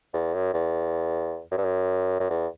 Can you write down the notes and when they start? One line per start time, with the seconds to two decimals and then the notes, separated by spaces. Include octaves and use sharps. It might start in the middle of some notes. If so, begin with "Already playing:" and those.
0.14 E2
0.34 F#2
0.54 E2
1.51 F#2
1.57 G2
1.64 F#2
2.20 F#2
2.30 E2